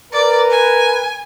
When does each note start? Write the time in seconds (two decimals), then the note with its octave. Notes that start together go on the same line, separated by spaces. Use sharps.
0.13 A#4 B4 D5
0.51 G#5